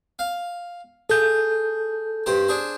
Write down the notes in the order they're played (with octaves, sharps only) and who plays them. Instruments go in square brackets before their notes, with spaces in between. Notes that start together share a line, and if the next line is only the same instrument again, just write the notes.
[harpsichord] F5
[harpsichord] G#4 [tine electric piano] A4 G6
[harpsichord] G2 G4 C5
D4 G#4 C5